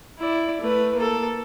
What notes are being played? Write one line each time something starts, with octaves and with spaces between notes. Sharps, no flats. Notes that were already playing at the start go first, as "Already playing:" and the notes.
E4 D5
A3 B4
A#3 A4